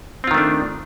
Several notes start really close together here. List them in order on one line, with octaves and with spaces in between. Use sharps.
C4 F4 D#3 A3 D4